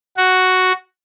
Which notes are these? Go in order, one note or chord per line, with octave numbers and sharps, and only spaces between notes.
F#4